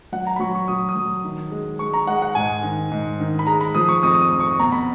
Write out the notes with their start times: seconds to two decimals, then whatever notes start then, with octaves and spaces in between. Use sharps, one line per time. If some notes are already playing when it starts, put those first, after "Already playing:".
0.12 F#3 F#5
0.27 A#5
0.36 B5
0.40 F#3 C#6
0.55 C#6
0.68 F#3 D#6
0.89 D#6
0.95 F#3
1.24 D#3
1.51 G#3
1.79 G#3 C#6
1.94 A#5
2.07 G#3 F#5
2.22 F#5
2.35 G#2 G#5
2.63 D#3
2.92 G#2
3.20 D#3
3.39 B5
3.47 G#3 A#5
3.61 B5
3.75 F3 D#6
3.89 C#6
4.03 F2 D#6
4.21 D#6
4.31 F2
4.40 C#6
4.60 B2 A#5
4.72 B5